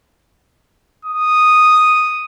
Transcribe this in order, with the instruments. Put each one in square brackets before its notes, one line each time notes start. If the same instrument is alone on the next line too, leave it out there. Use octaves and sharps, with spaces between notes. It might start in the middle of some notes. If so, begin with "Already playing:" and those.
[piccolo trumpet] D#6